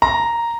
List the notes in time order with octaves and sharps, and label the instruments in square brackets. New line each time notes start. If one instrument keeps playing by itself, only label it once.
[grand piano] A#5